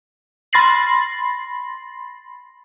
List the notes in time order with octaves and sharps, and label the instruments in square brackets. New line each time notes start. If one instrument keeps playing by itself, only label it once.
[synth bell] B5 C6 A6 A#6 C7 F#7